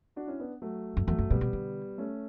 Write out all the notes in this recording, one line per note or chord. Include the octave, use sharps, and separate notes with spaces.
D4 F#4
C#4 E4
B3 D4
F#3 A3
F#2
E2 F#3 A3
F#2
B2 G3 B3
B2
D3
A3 C#4